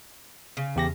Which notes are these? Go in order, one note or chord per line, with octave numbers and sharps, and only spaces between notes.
C#3
E2 G4 A#6